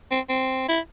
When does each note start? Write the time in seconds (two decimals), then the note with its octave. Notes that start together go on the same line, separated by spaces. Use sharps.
0.11 C4
0.29 C4
0.68 E4